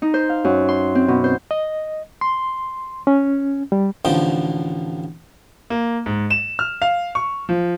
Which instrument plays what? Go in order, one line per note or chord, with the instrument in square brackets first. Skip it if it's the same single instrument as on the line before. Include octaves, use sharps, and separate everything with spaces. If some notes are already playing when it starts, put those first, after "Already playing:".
[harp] D#4
C5
F5
F#2
C6
C4
B2
C5
[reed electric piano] D#5
C6
C#4
G3
[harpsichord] A1 D3 F3 G5
[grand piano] A#3
G#2
E7
F6
F5
C#6
F3